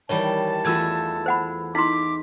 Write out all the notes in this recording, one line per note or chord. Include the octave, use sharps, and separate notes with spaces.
D#3 E3 G3 C#5 A5
E2 A3 F4 E6 G#6
C5 F#5 B5
D#4 E4 C6 D6 B6